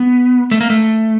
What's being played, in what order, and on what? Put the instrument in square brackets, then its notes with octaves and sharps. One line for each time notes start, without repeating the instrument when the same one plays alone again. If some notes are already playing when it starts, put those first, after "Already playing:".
Already playing: [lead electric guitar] B3
A3
A#3
A3